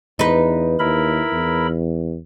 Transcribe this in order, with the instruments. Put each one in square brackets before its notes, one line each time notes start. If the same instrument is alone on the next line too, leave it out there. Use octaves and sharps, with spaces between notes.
[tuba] E2 [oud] D#4 B4
[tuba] D#2 [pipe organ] E4 A#4 B5
[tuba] E2